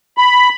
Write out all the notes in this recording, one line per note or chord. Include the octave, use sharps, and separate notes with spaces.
B5